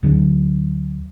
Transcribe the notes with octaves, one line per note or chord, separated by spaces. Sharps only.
D2 D3 F#3